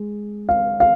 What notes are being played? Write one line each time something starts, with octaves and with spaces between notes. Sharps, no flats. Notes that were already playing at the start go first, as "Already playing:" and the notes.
Already playing: G#3
F5
F5